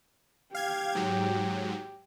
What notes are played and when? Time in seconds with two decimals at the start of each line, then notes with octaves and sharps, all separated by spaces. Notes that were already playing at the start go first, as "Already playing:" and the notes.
0.55 G4 F5 G#6
0.95 G#2 F#3